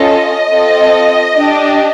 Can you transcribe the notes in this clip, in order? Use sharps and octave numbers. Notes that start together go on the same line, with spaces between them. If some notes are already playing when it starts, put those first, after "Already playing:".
Already playing: C#4 F4 A4 D#5
C4 F4 A4
D4 G4